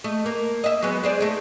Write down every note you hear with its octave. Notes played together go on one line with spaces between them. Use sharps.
A3 D#5
A#3
D#5 E5
F#3 G#3 B3
G#4 C5 D5
A3 D#4